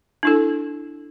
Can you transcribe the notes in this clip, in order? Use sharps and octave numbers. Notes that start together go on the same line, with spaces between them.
D4 E4 A4